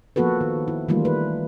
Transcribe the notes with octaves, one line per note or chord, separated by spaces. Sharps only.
F3 A#3 B3 F#4 A4 B4
D#3
E4
D#3 E3 G3 A3 A#3 F4
B4